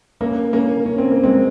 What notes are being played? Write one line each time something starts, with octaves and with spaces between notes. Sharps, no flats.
A#3 C#4
A#3 C#4
C#4
C4
A#3
G#3 C4